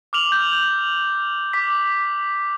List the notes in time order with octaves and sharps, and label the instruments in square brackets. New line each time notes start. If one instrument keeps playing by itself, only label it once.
[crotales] D6 F6 F7 F#7
G6
D6 B6